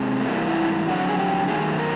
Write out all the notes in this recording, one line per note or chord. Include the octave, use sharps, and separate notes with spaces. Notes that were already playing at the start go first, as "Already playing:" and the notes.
Already playing: C3 G#3
A3
G#2 E3 G3 A#3
E4
F2 D3 F#3 F#4
G#4
G4
G2 D#3 F#3 A3 G#4
A#4